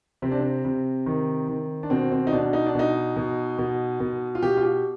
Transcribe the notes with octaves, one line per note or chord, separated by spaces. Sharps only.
C3 C4
D4
C4
C3
D#3
D#3
D4
B2 C4
C4
D#4
B2 D4
D#4
D4
B2 D#4
B2
B2
B2
F4
B2 G4
F4
G4